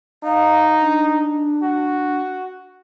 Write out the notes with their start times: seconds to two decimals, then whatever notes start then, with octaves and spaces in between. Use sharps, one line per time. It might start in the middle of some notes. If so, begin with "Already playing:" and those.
0.24 D#4 F5
0.79 D4
1.63 F#4